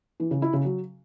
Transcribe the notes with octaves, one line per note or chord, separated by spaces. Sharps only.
E3
C#3
E4
C#3
F#3